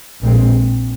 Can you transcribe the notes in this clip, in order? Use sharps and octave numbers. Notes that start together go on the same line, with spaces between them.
A#1 A#2 G#3 C4